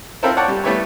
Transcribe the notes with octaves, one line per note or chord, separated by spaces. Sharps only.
C4 E4 F4 A4 A#4 C5
C#5 D5 F#5 G5 A5 C#6
G3 G4
G3 A3 B3 E4 G4 C#5